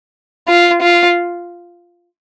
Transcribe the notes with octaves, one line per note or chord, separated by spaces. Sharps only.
F4
F4